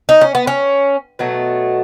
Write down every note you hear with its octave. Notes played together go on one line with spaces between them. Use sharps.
D#4
C#4
B3
C#4
B2 F#3 A3